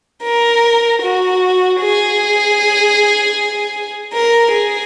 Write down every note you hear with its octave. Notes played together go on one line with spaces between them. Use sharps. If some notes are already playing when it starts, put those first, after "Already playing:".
A#4
F#4
G#4
A#4
G#4